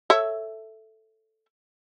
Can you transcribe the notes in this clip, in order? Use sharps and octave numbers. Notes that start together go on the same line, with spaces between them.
A4 C#5 E5